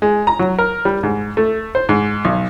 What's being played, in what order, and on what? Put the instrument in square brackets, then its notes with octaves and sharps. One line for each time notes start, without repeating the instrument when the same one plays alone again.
[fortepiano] G#3
A#5
F#3
A#4
G3
G#2
A3
C5
G#2
B1